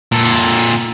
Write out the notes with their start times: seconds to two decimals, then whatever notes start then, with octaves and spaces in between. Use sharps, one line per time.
0.12 A#2 A4